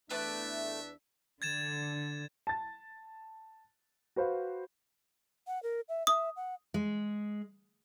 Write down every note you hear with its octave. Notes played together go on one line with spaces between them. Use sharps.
E2 A3 D4 B4 D5 E5 A5
D3 G#6 A6 E7
A5 A6
F#4 B4 C5 F5
F#5
A#4
E5
E5 D#6
F#5
G#3